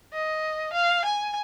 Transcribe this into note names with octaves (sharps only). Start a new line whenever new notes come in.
D#5
F5
G#5